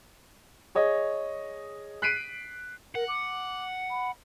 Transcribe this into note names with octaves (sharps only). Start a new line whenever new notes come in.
G#4 C#5 D#5
F#6 B6 C7 D7 D#7
A#4 F#5
D6
B5